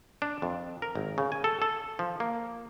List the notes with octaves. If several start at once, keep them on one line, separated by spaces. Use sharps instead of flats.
D4
F2
A#4
G#1
C#3
G#5
A4
A4
F3
A#3